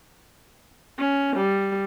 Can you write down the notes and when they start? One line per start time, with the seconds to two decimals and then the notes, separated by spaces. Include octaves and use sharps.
0.99 C#4
1.37 G3